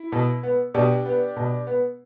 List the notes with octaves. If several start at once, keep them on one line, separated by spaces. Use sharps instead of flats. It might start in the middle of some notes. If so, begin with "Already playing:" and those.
Already playing: E4
B2
B3
B2 D4 G4
B3
B2
B3